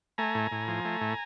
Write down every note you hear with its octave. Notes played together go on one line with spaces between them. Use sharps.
A3 G#5 A#5
A2
A2
F3
A3
A2